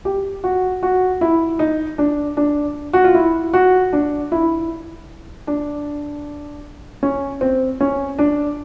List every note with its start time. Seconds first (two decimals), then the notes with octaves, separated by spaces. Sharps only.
0.05 G4
0.44 F#4
0.83 F#4
1.21 E4
1.59 D#4
1.98 D4
2.37 D4
2.93 F#4
3.04 F4
3.15 E4
3.53 F#4
3.93 D4
4.32 E4
5.47 D4
7.03 C#4
7.41 C4
7.81 C#4
8.19 D4